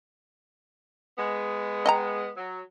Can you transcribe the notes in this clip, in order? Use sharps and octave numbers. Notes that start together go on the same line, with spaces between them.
G#3 B3
D#5 G5 A#5
F#3